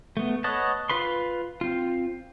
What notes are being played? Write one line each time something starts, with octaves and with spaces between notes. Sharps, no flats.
A3 B3
B4 C#5 D#5 F#5 A5
F4 B4 B5 C6
C4 F4